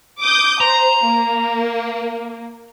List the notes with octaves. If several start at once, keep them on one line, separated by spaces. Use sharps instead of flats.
D6 D#6 G6
C5 A#5
A#3